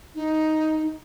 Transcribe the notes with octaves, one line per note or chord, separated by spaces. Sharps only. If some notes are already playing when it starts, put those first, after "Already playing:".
D#4